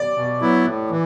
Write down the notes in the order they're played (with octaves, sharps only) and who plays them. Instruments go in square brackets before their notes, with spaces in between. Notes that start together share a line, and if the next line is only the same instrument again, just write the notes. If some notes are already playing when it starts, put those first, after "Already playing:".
Already playing: [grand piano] D5
[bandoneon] B2
F#3 B3 E4
A2
E3